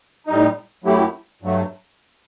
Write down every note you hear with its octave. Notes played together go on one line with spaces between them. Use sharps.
A2 G3 D#4
F#2 F#3 A3 E4 G4
G2 F#3 A3